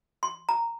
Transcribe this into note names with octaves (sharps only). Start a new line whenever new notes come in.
C6
A#5